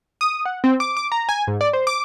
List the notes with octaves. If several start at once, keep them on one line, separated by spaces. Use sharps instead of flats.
D#6
F#5
C4
D6
D6
A#5
G#5
G#2
D5
C5
D6